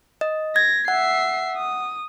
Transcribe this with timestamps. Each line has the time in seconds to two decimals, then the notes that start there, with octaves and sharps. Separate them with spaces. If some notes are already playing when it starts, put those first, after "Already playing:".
0.21 D#5
0.56 G#6 A#6
0.88 E5 F#5 C7
1.57 D#6